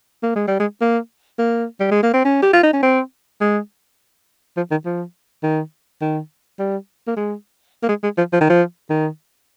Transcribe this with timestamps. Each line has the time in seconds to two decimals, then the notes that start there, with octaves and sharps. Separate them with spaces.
0.23 A#3
0.36 G#3
0.48 G3
0.60 G#3
0.81 A#3
1.39 A#3
1.80 G3
1.91 G#3
2.03 A#3
2.14 C4
2.25 C#4
2.43 G4
2.53 F4
2.63 D#4
2.74 C#4
2.83 C4
3.41 G#3
4.57 F3
4.71 D#3
4.85 F3
5.43 D#3
6.01 D#3
6.59 G3
7.07 A#3
7.17 G#3
7.83 A#3
7.89 G#3
8.04 G#3
8.18 F3
8.33 F3
8.41 D#3
8.50 F3
8.90 D#3